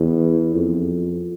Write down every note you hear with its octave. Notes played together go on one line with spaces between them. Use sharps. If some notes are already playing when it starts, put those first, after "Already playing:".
Already playing: E2
F2